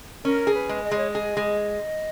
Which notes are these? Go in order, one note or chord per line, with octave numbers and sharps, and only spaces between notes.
C#4 A#4
G#4
B4
G#3
D#5
G#3
C#5
G#4 D#5
G#3